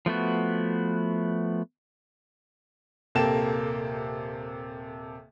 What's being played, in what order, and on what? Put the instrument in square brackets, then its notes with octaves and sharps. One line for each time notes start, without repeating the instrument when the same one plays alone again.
[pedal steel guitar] F3 A3 B3 F#4
[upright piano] D#1 C3 A#3 A4 G5 E7